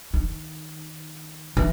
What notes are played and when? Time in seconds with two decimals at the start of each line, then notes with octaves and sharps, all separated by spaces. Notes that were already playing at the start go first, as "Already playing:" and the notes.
0.14 D#3
1.57 E3